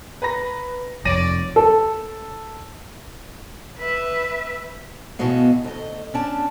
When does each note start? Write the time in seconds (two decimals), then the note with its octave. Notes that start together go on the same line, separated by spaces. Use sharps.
0.22 B4 A#5 A#6
1.05 F1 F2 C#5 D5 A#6 D#7
1.56 A4
3.79 B4 E5
5.19 B2 E3 B3 F#4 D#5 F5
5.64 D2 D#5
6.14 C#4 D4 A5